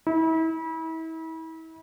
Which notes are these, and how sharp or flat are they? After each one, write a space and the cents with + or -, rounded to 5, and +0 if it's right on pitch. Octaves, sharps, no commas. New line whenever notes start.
E4 -35